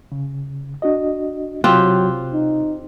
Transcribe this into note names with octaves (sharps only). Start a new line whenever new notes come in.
C#3
D4 F#4 D#5
C3 F#3 C4 F4 G4 F#6
D#4